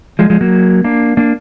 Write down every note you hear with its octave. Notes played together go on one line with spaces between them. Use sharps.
F3 G#3
F3 G#3
F#3 A#3
A#3 D4
A#3 D4